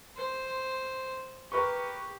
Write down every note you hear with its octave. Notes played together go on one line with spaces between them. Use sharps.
C5
G4 A#4 B4 C#6